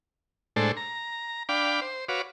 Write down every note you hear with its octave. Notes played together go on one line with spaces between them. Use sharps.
A2 G#3 D4 A4 C5
A#5
D4 F5 G5 B5 D6
C5
F#4 B4 C#5 F5 D6